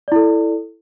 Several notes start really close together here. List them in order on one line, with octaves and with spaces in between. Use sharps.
D5 E4 A4